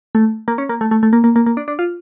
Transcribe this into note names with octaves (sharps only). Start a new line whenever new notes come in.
A3
A#3
C#4
A#3
A3
A3
A3
A#3
A#3
A#3
A#3
D4
D4
F4